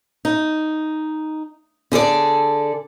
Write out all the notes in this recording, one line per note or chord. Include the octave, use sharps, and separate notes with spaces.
D#4
D3 G#4 A4 D5